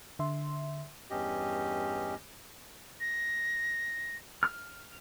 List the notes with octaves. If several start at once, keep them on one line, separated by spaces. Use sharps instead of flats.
D3 E5 C6
E2 G2 C#4 G4 D#5
A#6
F6